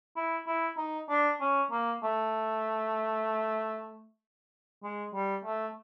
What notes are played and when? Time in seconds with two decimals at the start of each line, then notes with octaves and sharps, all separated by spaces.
0.16 E4
0.47 E4
0.77 D#4
1.10 D4
1.40 C#4
1.71 A#3
2.03 A3
4.83 G#3
5.14 G3
5.45 A3